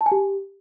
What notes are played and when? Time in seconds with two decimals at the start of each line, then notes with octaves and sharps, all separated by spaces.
0.01 A5
0.06 G#5
0.12 G4